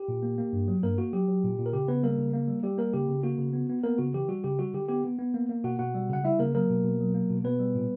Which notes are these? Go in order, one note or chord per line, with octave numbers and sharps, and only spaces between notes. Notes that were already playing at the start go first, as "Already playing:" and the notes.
Already playing: G4
A#2
A#3
A#3
G2
F#3
G2 A#3 A#4
A#3 F#4
F#3 G4
F#3
A#2
A#2
A#4
C#3 G4
C#3 B3 B4
G3 A#3 A#4
C#3
A#3
G3
G3 G4
A#3 A#4
C#3 G4
C#3
A#3 F#4
C#3
B3
B3
A#3 B3 A#4
C#3 F#4
E3 G4
G3 F#4
C#3 G4
G3 F#4
D3 G4
B3 G4
B3
B3
A#3
A#3
B2 F#4 F#5
B2 F#4 F#5
G3
C#3 F#5
G3 E4 E5
C#3 A#3 A#4
F#3 A#3 A#4
B2
B2
F#3
A#3
B2
B2 B3 B4
G3
A#2